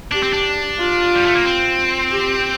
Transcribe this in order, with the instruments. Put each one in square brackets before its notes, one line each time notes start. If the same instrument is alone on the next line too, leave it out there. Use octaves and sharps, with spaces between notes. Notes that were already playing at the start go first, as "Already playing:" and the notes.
[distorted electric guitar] D4 [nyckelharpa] G4
[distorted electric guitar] C4
D4
[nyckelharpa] F4
[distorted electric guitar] G3
A3
A#3
C4
[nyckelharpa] G4